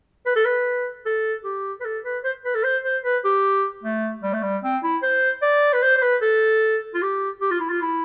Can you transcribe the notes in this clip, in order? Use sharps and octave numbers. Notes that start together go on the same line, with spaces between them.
B4
A4
B4
A4
G4
B4
A4
B4
C5
B4
A4
C5
C5
B4
G4
A3
G3
A3
G3
C4
E4
C5
D5
B4
C5
C5
B4
A4
F4
G4
G4
F4
E4
F4
E4